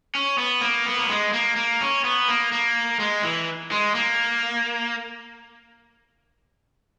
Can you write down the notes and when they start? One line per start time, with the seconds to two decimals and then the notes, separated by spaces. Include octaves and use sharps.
0.15 C#4
0.38 B3
0.61 A#3
0.86 B3
0.99 A#3
1.09 G#3
1.33 A#3
1.56 A#3
1.81 C#4
2.04 B3
2.28 A#3
2.52 A#3
2.99 G#3
3.23 E3
3.71 G#3
3.95 A#3